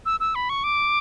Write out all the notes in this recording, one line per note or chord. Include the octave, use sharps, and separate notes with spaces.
E6
E6
B5
C#6
D6